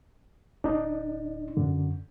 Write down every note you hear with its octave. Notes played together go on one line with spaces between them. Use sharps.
D1 D4 D#4
F#2 D3